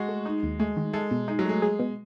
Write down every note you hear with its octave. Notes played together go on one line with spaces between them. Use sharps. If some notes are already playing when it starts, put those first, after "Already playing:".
Already playing: G#3 F#4
A3
D#4
D#2
G#3 A3
D#3
G#3 A4
B2
G#3 D#4
F#3
G#3 A3
G#4
B2